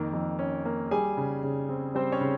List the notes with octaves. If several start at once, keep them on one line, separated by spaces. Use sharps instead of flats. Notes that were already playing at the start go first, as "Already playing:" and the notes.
Already playing: F2 D#3 A#3
F2
C#4
A#3
G3 G#4 G#5
C#3
C#3
C4
G3 C4 C5
C#4 C#5
C#3